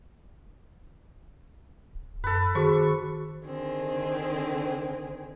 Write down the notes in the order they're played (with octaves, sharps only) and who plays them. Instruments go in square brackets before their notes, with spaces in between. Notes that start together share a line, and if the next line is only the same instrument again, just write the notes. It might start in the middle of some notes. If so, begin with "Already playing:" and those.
[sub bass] D1
[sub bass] F#2 [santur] A4 B4
[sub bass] D#3 [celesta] F#4 G#4 C5 [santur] C#6
[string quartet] D3 D#3 C4 G#4